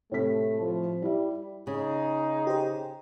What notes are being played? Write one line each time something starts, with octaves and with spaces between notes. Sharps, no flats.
A2 C3 A3 B6
F3
G3 E4 G4 E5
C#3 D#4 G#4
G4 C5